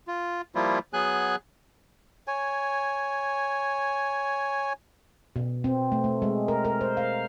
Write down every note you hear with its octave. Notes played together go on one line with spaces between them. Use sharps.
F4
F3 G3 A#3 E4 F4
F#3 B3 G#4 G#5 F#6
C#5 G#5
B2
C4
A3
A3
G#3
A#4
A#4
C5
F5